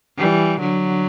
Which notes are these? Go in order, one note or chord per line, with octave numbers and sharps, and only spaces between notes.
E3 G3
D3 F#3